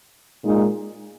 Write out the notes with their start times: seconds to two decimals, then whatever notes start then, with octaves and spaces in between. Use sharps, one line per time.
0.44 A#2 G#3 D#4